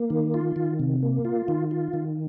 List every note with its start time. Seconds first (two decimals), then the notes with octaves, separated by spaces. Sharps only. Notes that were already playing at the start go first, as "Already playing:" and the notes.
Already playing: A#3
0.10 D#3
0.34 F4
0.56 D#3
0.79 C3
1.03 A#3
1.25 F4
1.48 D#3
1.71 F4
1.93 D#3